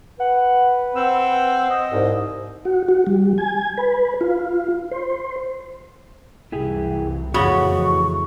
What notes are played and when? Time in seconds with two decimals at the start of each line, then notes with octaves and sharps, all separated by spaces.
0.19 B4 F#5
0.95 C4 F#5 E6
1.70 D#5
1.91 C2 G#2
2.65 F#4
2.88 F#4
3.07 G3
3.38 G#5
3.78 B4
4.21 F4
4.91 C5
6.52 C2 F#2 E3 E4 G4 G#4
7.34 F2 A2 C#3 E3 B3 F#4 F#5 C#6